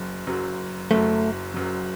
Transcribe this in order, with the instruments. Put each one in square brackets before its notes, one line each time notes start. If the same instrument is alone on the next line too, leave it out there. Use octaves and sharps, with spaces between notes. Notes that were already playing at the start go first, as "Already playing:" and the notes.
Already playing: [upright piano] F#1 F#2 F#3
F#1 F#2 F#3
[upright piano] F#1 F#2 F#3 [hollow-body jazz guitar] A3
[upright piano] F#1 F#2 F#3